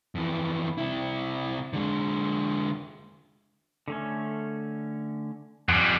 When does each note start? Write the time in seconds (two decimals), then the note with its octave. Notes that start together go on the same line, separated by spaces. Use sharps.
0.15 F2 E3
0.78 C3 E4
1.73 D3 G#3
3.88 D3 A3 C#4
5.69 F2 G3 F#5 G#5